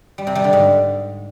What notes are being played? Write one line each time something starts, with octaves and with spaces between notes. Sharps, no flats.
G3
C3
G3
D3
G#2